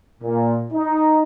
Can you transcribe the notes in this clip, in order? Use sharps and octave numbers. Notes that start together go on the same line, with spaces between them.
A#2
D#4